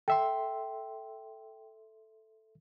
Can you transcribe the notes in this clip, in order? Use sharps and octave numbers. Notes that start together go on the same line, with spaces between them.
A4 E5 G5 C6